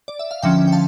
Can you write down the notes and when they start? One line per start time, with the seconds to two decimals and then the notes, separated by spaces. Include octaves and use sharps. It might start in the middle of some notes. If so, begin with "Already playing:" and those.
0.08 D5
0.19 E5
0.31 F5
0.42 D3 F3 C#4 E5 G5
0.67 G5
0.72 F5 A5